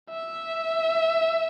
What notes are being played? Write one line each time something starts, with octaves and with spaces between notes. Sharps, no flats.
E5